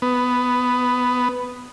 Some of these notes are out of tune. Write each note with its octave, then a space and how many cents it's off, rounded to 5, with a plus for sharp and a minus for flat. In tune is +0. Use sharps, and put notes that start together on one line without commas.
B3 +10